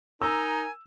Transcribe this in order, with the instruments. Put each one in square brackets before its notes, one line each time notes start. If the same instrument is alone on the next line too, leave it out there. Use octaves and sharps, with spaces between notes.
[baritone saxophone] D#4 [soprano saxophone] A#4 [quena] G#5 [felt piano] E6